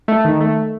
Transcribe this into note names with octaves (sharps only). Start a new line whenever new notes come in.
A3
D#3
A3